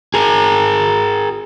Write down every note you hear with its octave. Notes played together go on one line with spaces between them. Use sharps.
G#4 A#4